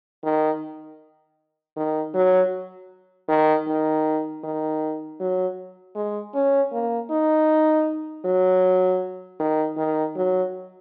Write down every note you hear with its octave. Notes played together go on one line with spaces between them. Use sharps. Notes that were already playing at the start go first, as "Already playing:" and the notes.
D#3
D#3
F#3
D#3
D#3
D#3
F#3
G#3
C#4
A#3
D#4
F#3
D#3
D#3
F#3